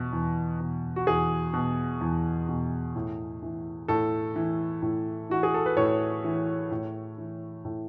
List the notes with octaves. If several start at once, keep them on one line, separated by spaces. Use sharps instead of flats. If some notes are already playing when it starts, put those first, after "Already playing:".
Already playing: E2 B2
E2
B2
F#4
E2 G#4
B2
E2
B2
A2
E3
A2 A4
E3
A2
E3 F#4
G#4
A4
B4
A2 C#5
E3
A2
E3
A2